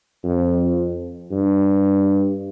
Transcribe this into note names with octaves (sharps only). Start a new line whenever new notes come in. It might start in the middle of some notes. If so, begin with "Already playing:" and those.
F2
G2